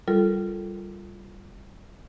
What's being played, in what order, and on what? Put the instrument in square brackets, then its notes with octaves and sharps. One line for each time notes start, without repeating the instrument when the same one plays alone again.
[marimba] G3 F4 A4 A#4